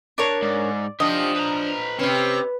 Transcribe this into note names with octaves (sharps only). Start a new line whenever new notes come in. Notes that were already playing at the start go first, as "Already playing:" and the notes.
D4 A#4 C#5 A5
G#2 D5
F3 D4 F4 G4 D#5
B4 A#5
C3 C4 C#4 B4